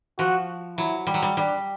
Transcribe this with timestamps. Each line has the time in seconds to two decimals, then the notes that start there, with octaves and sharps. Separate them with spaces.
0.18 F3 F#4
0.77 F#3 E4
1.07 G3
1.14 F#3
1.23 G3
1.37 G3 D4